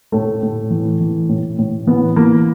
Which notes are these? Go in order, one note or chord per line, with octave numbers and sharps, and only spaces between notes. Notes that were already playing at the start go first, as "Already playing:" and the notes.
A2 A3
A2
E3
E3
A2
A2
E3 B3
E3 A#3